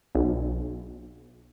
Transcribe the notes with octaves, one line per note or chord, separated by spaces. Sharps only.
B1